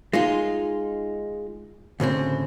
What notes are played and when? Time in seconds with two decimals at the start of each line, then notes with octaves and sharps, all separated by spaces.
0.13 G#3 D#4 F4
2.00 D2 A2 C#3 C4